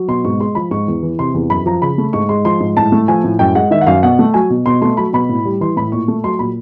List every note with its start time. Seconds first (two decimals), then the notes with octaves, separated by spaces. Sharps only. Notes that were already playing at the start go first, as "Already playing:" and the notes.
Already playing: F#3
0.08 B2 C6
0.25 G#2 C#6
0.40 G#3 C6
0.55 F3 B5
0.71 G#2 C#6
0.88 E2
1.03 E3
1.19 C3 C6
1.34 E2
1.50 F#2 B5
1.66 F3 A#5
1.82 C#3 B5
1.98 A3
2.13 G#2 C#6
2.29 G#3 C6
2.45 F3 C6
2.60 G#2
2.77 A2 A5
2.92 A3
3.08 F3 G#5
3.24 A2
3.39 F#2 G5
3.55 G#3 F#5
3.71 D#3 E5
3.81 F#5
3.87 F#2 F5
4.03 B2 F#5
4.19 A3
4.34 F#3 G#5
4.50 B2
4.66 B2 C6
4.82 A3 C6
4.97 F#3 B5
5.13 B2 B5
5.29 A2
5.45 G3
5.61 E3 C6
5.77 A2 B5
5.92 A#2 C#6
6.08 A3
6.24 F#3 C6
6.39 A#2 B5